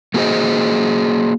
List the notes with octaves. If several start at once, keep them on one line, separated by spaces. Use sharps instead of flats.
A3 A#3 F#4 G#4 C5 D#5